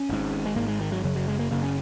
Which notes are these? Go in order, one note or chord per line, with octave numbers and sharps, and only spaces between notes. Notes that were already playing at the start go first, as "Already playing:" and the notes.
Already playing: C#4
G#1 G#2
G#3
G#1 G#2 A#3
G#3
D#3
F#3
F#1 F#2 C#3 F#3
F#3
G#3
A#3
F#1 F#2 C#3 A#3
C#4